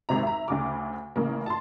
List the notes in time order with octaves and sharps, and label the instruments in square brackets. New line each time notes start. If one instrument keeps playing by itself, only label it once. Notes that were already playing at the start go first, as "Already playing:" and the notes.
[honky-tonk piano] G#1 C3 A#5
E5 A#5
D2 C#3 D6
A1 C#3 A#3
A5 C6